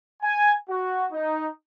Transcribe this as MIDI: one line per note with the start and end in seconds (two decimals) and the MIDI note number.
0.22 0.51 80
0.69 1.04 66
1.12 1.47 63